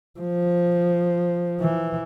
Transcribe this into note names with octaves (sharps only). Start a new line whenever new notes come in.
F3
E3